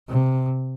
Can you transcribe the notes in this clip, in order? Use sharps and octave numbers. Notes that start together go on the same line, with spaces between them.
C3